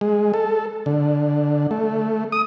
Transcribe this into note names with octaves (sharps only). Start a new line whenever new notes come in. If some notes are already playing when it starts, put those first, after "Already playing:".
G#3
A4
D3
A3
D#6